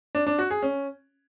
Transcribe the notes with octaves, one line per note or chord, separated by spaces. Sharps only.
D4
D4
F#4
G#4
C#4